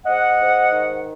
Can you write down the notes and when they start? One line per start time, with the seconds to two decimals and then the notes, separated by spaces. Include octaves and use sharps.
0.05 G#2 D#5 F#5
0.39 G#2
0.72 D#3